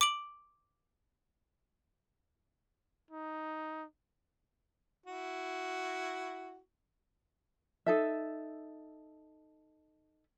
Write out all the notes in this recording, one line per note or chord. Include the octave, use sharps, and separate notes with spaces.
D6 D7 F#7
D#4
E4 F#4
D#4 A4 E5